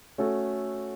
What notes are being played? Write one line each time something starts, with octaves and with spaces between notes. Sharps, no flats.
A3 C#4 F#4 A4